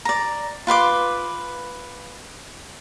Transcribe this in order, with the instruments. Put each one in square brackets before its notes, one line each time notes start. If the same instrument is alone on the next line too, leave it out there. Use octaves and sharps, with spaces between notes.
[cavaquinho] D5 A#5
F4 B4 C6 D6